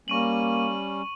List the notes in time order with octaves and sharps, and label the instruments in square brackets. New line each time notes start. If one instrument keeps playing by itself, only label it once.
[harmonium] G3 C#4 [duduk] A#3 [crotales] C#6 D#7 F#7